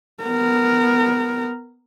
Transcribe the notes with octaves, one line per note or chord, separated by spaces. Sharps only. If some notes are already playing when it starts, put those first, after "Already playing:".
B3 A#4